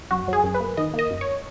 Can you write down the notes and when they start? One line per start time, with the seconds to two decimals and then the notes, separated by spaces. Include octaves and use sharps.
0.11 F#2 F#4
0.28 F#3 G#4
0.44 F#2
0.54 B4
0.60 A#3
0.77 D#3 D#5
0.94 A#3
0.99 D#5
1.10 F#2
1.21 C#5